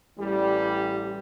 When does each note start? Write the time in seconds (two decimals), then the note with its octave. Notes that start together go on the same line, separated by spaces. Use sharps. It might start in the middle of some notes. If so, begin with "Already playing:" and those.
0.18 A1 G3